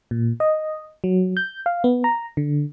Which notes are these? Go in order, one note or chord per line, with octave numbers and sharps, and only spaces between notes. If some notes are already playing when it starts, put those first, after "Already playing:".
A#2
D#5
F#3
G6
F5
B3
A#5
D3